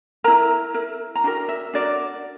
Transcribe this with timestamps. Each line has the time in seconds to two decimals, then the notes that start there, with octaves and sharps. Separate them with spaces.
0.24 E4 A#4 A#5
0.74 E4 A#4
1.15 A#5
1.24 D4 F#4 A#4 G5
1.49 E5
1.73 D4 F#4 A#4 D5